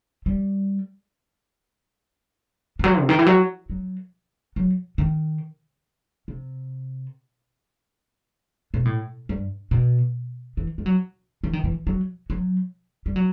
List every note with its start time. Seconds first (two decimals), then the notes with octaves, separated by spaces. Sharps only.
0.26 G3
2.79 E3
2.84 F#3
3.00 C3
3.09 D#3
3.19 E3
3.26 F#3
3.70 F#3
4.56 F#3
4.98 D#3
6.28 C3
8.74 B2
8.85 A2
9.29 G2
9.71 B2
10.57 E3
10.78 G3
10.86 F#3
11.44 E3
11.53 D#3
11.64 E3
11.87 F#3
12.30 F#3
13.06 G3
13.16 F#3